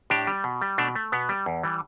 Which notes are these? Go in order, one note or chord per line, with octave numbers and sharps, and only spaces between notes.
A2 D4 G4
G3
B2
G3
B2 A3 D4
A3
B2 B3
G3
E2
E3 G3